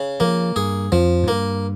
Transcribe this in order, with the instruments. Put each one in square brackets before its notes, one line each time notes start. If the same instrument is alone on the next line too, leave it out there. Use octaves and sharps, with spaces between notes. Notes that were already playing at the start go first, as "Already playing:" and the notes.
Already playing: [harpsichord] C#3
[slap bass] F3 [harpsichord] A#3
[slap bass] G2 [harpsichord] G#4
[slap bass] F2 [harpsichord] F3
[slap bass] G#2
[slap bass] G2 [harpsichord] A#3